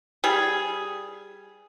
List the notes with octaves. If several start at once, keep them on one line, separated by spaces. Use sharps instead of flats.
G3 G#4